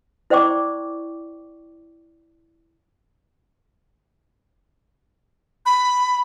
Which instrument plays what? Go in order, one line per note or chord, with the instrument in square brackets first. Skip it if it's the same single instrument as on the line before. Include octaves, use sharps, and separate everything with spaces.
[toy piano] E4 C5 D5 G5 C#6 D6
[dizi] B5